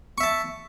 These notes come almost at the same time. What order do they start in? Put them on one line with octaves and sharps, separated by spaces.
C#6 E5 A5